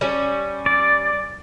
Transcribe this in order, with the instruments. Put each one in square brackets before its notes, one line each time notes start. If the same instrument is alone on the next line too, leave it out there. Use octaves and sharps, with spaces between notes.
[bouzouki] G3 C#4
[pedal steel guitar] D5